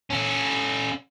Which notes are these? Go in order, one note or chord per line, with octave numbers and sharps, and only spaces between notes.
C#4 A4